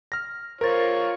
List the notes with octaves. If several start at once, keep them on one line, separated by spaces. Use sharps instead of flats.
F6 A#6
F4 A#4 C5 C#5 A6